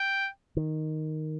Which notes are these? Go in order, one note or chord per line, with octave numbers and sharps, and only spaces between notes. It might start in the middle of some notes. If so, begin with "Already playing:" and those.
Already playing: G5
D#3